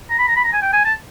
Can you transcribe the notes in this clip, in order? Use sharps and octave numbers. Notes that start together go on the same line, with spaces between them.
A#5
B5
A#5
B5
A#5
G#5
G5
G#5
A5